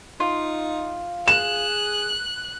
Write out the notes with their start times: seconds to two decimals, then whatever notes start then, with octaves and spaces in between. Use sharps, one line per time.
0.20 D#4 F4
1.28 G#4 F#6 E7